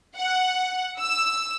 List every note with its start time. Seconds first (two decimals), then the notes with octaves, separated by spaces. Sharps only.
0.18 F#5
1.00 E6